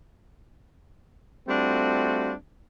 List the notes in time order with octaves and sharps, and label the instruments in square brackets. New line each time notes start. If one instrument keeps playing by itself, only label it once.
[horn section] G3 A3 C4 D4 F4 F#4